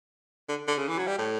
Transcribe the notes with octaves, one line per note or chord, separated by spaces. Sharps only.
D3
D3
C#3
E3
F#3
G3
A2